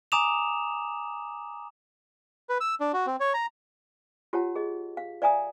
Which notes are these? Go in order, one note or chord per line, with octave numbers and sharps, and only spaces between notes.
G#5 A#5 D6 D#6 E7 F7
B4
E6
D4
F#4
C4
C#5
A#5
F4 G4 C#5 F#5 A5
G#4 D#5
F5
D5 E5 F5 G#5 A#5 D#6